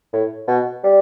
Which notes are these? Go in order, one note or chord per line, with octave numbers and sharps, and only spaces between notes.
A2
B2
G3